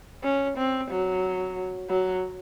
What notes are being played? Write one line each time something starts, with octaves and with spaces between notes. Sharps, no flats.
C#4
C4
F#3
F#3